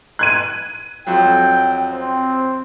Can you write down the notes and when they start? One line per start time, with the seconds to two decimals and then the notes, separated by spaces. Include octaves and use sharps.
0.19 F#6 G#6 D#7
1.07 F2 F#3 G5
1.91 C4